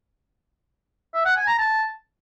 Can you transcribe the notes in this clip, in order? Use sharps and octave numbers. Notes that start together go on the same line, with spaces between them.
E5
F#5
G#5
A#5
A5